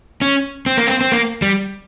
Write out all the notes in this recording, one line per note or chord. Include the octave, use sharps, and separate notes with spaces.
C#4
C4
A#3
C4
C4
A#3
G3